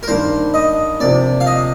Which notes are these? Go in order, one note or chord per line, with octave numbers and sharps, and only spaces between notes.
A#4
G2 D#3 A#3 D4 C5
D#5
C3 F3 A#3 D4 D5
F5
D#5